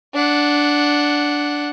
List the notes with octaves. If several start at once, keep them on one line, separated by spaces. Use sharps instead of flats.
D4 F#5